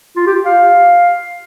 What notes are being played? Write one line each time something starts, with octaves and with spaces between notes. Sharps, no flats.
F4
G4
F5